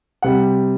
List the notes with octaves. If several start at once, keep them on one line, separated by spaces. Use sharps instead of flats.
C3 G3 F#5